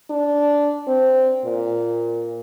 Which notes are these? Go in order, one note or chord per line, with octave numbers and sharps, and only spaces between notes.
D4
C4
A#2